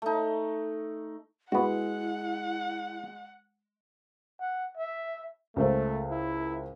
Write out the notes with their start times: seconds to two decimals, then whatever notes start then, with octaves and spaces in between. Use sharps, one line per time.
0.02 A3 D#4
1.52 G#3 B3 E4 F#4 F#5
4.41 F#5
4.77 E5
5.56 C#2 A3 A#4 C5
6.11 E4